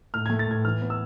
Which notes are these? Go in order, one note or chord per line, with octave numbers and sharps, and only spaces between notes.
A2 F6
A3 G#6
A6
A2 G#6
E3 F6
B3
E6